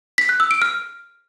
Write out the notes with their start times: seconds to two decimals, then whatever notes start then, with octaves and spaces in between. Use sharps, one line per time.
0.18 B6
0.29 F#6
0.40 E6
0.51 D7
0.62 F6